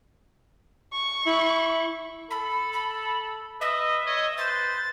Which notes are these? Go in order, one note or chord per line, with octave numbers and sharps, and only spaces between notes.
C#6
E4
A4 B5
B5
B4 D#5 E5
C#5 D#5
B4 C5 A6